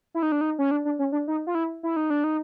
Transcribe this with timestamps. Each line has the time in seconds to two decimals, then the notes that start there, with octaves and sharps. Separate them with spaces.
0.14 E4
0.23 D#4
0.32 D4
0.41 D#4
0.59 C#4
0.71 D4
0.85 D4
0.99 C#4
1.12 D4
1.28 D#4
1.47 F4
1.55 E4
1.83 E4
1.96 D#4
2.10 D4
2.24 D#4